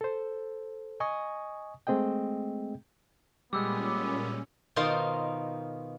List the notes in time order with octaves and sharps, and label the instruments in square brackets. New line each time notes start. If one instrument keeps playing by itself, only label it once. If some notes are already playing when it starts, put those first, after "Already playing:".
[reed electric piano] A4 C5
D#5 G#5 C#6 D#6
G#3 A3 C4 G#4 D#5 G5
[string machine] A#2 C#4 [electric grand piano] G3 G#3 [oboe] B3 [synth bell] D6 E6
[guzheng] B2 D#3 F4 A#4 C5 F5